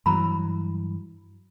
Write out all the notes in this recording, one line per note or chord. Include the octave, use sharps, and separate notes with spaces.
G2 E3 F#3 A#5 B5